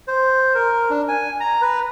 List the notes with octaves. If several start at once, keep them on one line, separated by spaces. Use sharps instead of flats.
C5
A#4
D4
G#5
A#5
B4